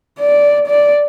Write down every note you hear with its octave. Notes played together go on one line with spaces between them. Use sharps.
D5
D5